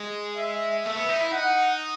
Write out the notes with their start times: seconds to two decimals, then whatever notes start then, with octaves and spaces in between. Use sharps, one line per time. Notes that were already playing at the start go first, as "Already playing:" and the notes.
Already playing: G#3
0.37 E5
0.85 A3 E5
0.97 B3
1.09 D#4
1.21 E4
1.32 D#4 F#5